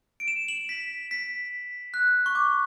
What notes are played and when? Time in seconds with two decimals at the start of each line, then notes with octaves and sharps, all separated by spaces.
0.20 D7
0.28 E7
0.48 F#7
0.69 B6
1.11 B6
1.94 F#6
2.26 C#6
2.35 D6